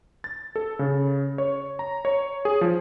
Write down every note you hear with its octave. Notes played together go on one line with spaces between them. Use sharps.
A6
A4
C#3
C#5
A#5
C#5
G#4
F3